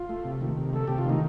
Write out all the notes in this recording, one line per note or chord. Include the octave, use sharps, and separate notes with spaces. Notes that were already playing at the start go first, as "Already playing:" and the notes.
Already playing: F4
A3
C3
D#3
C3
A3 A4
C3 G4
F4
D#3 D#4